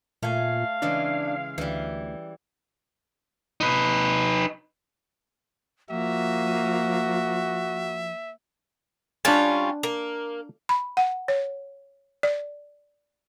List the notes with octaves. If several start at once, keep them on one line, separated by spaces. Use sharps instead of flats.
A#2 A3 F5 G#5
C#3 E3 G#3 D4
D2 E3 G3
D#4 B4
F3 A#3 F#4 E5
G3 C#4 D4 F4 G#5
A#3
B5
F#5
C#5
D5